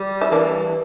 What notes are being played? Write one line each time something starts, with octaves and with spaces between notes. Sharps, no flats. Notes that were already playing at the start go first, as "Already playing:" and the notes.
Already playing: G3
E4
E3 A#3 D4